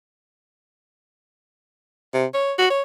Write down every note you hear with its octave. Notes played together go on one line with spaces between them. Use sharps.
C3
C#5
F#4
C#5